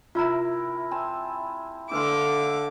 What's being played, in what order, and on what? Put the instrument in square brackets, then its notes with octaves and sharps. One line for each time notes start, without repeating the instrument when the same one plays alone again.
[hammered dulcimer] C3 E4 A#4 [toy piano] F4 A#5
[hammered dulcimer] C4 G#5 A5
[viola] D3 D6 [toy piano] D4 B4 C6 [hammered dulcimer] E5 F5